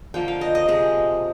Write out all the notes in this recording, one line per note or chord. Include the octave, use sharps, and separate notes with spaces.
D3 F3 A#3 G5
F5
D#5
D#5
C3 F3 G#3 D#5